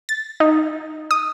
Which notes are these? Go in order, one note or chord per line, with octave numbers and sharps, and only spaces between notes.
A6
D#4
D#6